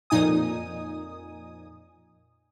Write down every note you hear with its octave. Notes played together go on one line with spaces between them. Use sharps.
F2 A#2 D#4 G#5 D#6